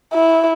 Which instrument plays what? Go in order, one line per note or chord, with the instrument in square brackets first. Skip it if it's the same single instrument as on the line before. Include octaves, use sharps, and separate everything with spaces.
[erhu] E4